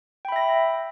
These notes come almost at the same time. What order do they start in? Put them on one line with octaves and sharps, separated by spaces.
G5 B5 E5 A#6